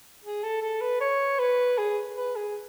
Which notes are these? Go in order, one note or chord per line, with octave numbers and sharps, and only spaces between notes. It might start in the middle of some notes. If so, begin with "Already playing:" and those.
G#4
A4
A4
B4
C#5
B4
G#4
B4
G#4